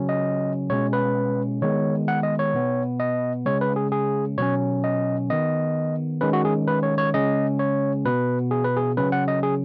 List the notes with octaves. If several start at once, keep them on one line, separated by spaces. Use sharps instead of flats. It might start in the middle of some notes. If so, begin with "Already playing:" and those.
Already playing: C#3 F#3 C#4
D#5
B2 G#3 C#4 C#5
B4
D#3 G#3 B3 C#5
F#5
D#5
C#5
B2 B3
D#5
C#3 G#3 C#4 C#5
B4
G#4
G#4
B2 F#3 C#4 C#5
D#5
D#3 B3 D#5
D#3 G#3 C#4 B4
F#4
G#4
B4
C#5
C#5
C#3 G#3 C#4 D#5
C#5
B2 B3 B4
G#4
B4
G#4
C#3 F#3 C#4 B4
F#5
D#5
G#4